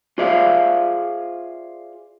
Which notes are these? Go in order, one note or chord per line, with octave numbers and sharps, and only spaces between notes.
F4 G#4 C5 D5 E5 F5